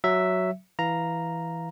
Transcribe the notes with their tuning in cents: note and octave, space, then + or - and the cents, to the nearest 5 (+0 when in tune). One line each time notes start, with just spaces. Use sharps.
F#3 +0 E5 +0
E3 +0 F5 +0 A#5 +0